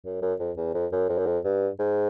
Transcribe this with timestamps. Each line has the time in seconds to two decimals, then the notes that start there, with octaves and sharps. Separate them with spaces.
0.05 F#2
0.22 F#2
0.39 F2
0.57 E2
0.74 F2
0.92 F#2
1.09 F2
1.18 F#2
1.27 F2
1.44 G2
1.79 G#2